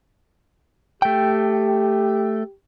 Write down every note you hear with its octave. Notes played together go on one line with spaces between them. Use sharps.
A3 G4 G5